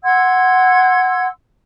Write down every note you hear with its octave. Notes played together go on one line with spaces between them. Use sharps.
F#5 C6 E6 G#6